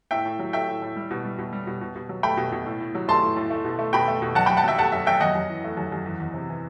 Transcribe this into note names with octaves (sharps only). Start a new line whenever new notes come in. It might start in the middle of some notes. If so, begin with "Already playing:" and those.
A2 E5 G5
A2
F#3
A3 E5 G5
A2
A2
G3
B2
G3
B2
G3
B2
B2
B2
F#3
A3 G5 B5
B2
B2
A2
A2
F#3
A3 A5 C6
A2
A2
A3
B2
A3
B2 G5 B5
A3
B2
F#2 F#5 A5
F#2 G5 B5
F#5 A5
F#3 E5 G5
A3 F#5 A5
F#2 E5
F#2 E5 G5
F#2 D#5 F#5
F#2
E3
A3
F#2
F#2
E2
E2
C3
E3